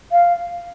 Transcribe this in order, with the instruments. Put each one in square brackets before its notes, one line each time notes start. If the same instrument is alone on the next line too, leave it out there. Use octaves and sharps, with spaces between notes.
[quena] F5